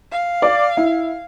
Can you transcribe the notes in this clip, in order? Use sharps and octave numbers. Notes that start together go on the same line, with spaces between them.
F5
D5
E4